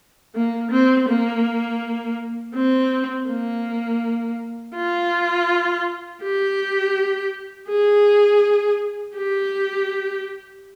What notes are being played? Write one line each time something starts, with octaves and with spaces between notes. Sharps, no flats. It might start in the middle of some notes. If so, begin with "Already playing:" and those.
A#3
C4
A#3
C4
A#3
F4
G4
G#4
G4